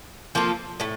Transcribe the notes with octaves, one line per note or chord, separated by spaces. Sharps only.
F3 A#3 F4 A4
A2 A3